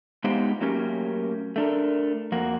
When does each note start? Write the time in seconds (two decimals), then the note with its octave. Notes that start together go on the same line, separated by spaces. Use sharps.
0.24 G#3 B3 D#4 F4 G4 C5
0.61 F#3 A3 A#3 C#4 G4
1.56 A3 D4 A#4
2.32 F2 A#3 F#4